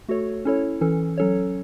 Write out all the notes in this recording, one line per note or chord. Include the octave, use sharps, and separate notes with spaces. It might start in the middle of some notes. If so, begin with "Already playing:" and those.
A3 F#4 A4 C#5
C#4 E4 A4 C#5
E3 C#4 A4
F#3 C#4 A4 C#5